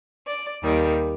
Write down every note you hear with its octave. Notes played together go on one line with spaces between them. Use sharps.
D5
D#2 D#3 G3